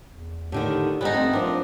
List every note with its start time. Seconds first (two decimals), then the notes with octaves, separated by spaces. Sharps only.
0.10 E2
0.52 A2 D3 D#3 G4
1.01 G#2 D3 G3 B3 D#4
1.14 A3 C4
1.33 F3 D4 A#4